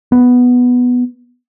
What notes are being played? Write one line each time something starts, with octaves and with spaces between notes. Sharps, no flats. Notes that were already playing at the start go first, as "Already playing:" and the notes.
B3